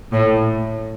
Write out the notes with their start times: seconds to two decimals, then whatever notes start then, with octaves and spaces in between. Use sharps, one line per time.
0.12 A2